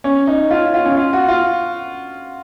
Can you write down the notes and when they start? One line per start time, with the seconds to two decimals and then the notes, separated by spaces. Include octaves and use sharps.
0.04 C#4
0.27 D#4
0.51 F4
0.74 F4
0.85 C#4
0.97 F4
1.13 F#4
1.28 F4